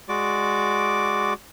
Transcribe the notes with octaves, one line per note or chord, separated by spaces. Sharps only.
G#3 F#4 D5 D6